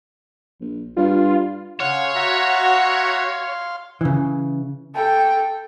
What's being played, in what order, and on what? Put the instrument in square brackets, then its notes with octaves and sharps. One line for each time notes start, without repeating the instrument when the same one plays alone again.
[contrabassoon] A#1
[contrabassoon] G2 [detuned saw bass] F4
[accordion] C#3 [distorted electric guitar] C#5 [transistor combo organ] F5 C6 [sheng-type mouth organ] F#5
[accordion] F#4 [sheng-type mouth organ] E5 F#5 A#5
[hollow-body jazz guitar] C#3 E3
[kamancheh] A4 G5